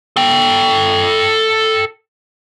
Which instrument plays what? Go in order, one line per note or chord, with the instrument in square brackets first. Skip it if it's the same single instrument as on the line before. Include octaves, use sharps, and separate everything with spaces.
[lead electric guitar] A4 G5